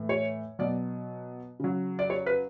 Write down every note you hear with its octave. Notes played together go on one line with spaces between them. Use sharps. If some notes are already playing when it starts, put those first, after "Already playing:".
Already playing: A2 E3
C#5
B2 F#3 D5
C#3 F#3
D5
C#5
B4